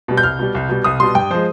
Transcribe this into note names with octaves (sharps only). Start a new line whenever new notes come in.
B2 G3
G6
C2 F6
B2 G3
C2
B2 G3
C2 D#6
B2 G3 C6
G2 G5
F3 G#3 C5